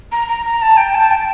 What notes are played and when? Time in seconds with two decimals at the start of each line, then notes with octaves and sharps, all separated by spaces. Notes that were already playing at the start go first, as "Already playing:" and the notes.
0.12 A#5
0.28 A#5
0.45 A#5
0.62 A5
0.77 G5
0.95 A5
1.11 G5